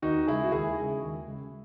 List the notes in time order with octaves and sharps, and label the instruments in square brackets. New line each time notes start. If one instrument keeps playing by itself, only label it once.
[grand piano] D#2 D#4 F#4
C#3 G#3 E4 G#4
F#4
D#2 E4 G#4
C#3 G#3
D#2
C#3 G#3